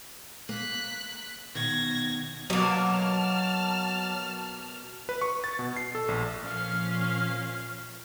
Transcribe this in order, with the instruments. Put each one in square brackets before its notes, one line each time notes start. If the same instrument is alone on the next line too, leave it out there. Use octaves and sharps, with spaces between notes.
[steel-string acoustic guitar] A#3 [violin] F#6 B6
[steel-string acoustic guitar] B2 D#3 [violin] G#6 A#6
[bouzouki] B2 A#3 [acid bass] F#3 [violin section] A5 F6
[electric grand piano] B4
C#6
A6
B2
C7
A4
A#1
[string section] A#2 F3 [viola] C#4 F5